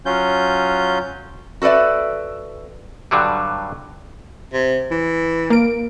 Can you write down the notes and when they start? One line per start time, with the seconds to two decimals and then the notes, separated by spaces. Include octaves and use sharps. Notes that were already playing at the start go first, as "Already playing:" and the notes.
0.06 F#3 C#4 F4 G6
1.62 F#4 A4 B4 D5 E5
3.11 G2 D3 F#3 G3
4.53 C3
4.91 E3
5.50 A#3 D7